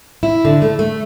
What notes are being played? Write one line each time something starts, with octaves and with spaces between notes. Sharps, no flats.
E4
D3
A3
A3